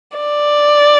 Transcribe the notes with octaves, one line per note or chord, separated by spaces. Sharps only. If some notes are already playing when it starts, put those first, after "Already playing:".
D5